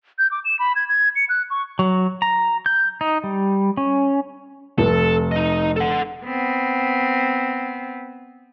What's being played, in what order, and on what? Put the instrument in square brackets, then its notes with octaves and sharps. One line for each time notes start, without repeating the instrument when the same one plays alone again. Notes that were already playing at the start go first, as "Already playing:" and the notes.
[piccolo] G6
D6
E7
B5
G#6
G#6
C#7
F#6
C#6
[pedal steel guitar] F#3
A#5
G6
D#4
G3
C#4
[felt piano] F1 [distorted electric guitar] A4
[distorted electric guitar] D#4 D#5
A4 F#5
[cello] B3 C4